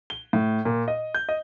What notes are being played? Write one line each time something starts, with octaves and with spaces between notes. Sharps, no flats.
G7
A2
A#2
D#5
G6
D#5